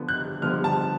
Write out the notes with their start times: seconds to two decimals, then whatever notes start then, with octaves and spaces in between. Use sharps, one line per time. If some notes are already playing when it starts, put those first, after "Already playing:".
Already playing: D3 F3 B3
0.09 F#6
0.42 D3 F3 B3 F6
0.64 A5